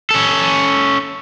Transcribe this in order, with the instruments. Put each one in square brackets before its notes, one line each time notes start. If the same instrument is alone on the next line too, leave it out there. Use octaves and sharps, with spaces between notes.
[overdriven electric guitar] C#4 A4